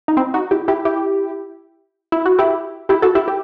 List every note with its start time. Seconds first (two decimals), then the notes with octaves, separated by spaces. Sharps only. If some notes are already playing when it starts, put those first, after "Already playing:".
0.08 D#4
0.17 C4 E4
0.34 D#4 F#4
0.51 E4 G4
0.68 E4 G4
0.85 E4 G4
2.12 E4
2.26 F#4
2.39 E4 G4
2.89 E4 G4
3.02 F#4 A4
3.15 E4 G4
3.28 G4